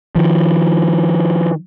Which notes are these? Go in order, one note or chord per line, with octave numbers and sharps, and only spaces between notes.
D#3 F3